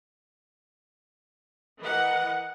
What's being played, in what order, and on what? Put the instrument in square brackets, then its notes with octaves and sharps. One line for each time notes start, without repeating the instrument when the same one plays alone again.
[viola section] E3 A#4 D#5 F#5